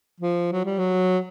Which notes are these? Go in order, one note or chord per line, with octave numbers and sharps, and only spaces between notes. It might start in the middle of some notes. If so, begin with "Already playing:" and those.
F3
F#3
G3
F#3